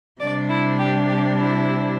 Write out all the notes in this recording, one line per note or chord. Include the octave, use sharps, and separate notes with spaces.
C3 G3 D4 D5
E4
G4
G4
E4